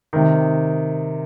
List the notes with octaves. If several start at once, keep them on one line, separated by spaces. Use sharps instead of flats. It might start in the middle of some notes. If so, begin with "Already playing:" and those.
C3 D#3